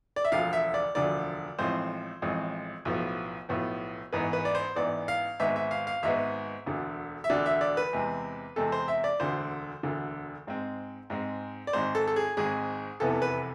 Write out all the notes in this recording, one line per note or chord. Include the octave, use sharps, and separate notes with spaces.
D5
E5
E1 D2 D3 F3 F5
E5
D5
E1 D2 D3 F3 D5
A1 A2 F3 G#3 C4 C5
A1 A2 F3 G#3 C4
B1 A2 F3 B3
B1 A2 F3 B3
A1 G#2 E3 B3 B4
B4
D5
C5
A1 G#2 E3 B3 D5
F5
G#1 G#2 G#3 B3 E5
E5
F5
F5
G#1 G#2 G#3 B3 E5
E1 D2 D3
E5
E1 D2 D3 D5
E5
D5
B4
E2 C3 G#3 C4
E2 C3 G#3 C4 A4
C5
E5
D5
E1 D2 D3 C5
E1 D2 D3
G#2 G#3 C4
G#2 G#3 C4
D5
G#1 G#2 G#3 C4 C5
A4
A4
G#4
G#1 G#2 G#3 C4 G#4
F1 E2 C3 E3 B3 A4
B4